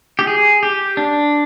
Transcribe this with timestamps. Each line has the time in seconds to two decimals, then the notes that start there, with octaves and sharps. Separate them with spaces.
0.19 G4
0.27 G#4
0.63 G4
0.97 D4